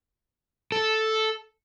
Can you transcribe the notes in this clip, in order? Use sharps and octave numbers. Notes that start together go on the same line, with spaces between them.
A4